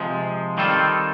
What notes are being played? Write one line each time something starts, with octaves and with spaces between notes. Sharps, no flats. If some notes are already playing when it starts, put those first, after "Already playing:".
Already playing: C3 F3 G#3
D#3 G3 C4 F4 A4